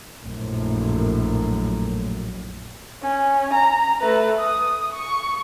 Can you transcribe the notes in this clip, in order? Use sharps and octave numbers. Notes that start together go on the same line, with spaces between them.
A#1 F#2 A2
C#4
A#5
A3 B4
D#6
C#6